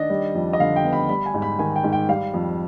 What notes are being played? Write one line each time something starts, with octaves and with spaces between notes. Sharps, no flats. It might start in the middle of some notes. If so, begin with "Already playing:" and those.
Already playing: D#3 D4 D#5
G3
F2
D#5
D3 F5
G5
B3
B5
G3 B5
G#5
G#2
B5
D#3 G#5
G5
G#2
G5
G3 F5
F2